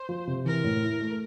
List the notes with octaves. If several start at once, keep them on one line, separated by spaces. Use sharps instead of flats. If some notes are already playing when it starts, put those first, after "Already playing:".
Already playing: C5
F3
C3
E3 A#4
A2
E4
A3